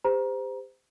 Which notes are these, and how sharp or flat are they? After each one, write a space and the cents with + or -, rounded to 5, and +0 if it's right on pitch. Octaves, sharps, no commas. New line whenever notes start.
G4 +35 C5 -25 A#5 +25